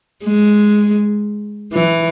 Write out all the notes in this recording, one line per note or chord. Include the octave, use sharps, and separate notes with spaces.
G#3
E3